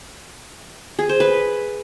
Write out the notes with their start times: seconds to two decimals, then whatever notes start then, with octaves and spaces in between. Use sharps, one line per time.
0.99 G#4
1.09 C5
1.20 B4